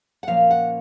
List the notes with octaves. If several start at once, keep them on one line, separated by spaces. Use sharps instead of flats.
F#5
A#2 F3 A#3 C#4 F5
F#5